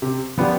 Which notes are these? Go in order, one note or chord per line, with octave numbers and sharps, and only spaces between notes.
C3
F3 B3 D4 G4